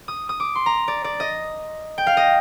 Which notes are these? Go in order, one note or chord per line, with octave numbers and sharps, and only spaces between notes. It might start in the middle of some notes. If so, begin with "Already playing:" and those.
D#6
D#6
D6
C6
A#5
D5
D5
D#5
G5
F5
D#5